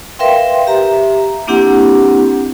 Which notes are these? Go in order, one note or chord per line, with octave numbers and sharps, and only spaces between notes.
A#4 B4 E5 F5 G5 C6
G4 E5 A#5
A#3 C4 D4 E4 G4 F#5